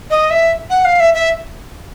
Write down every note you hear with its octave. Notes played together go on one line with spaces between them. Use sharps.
D#5
E5
F#5
F5
E5
E5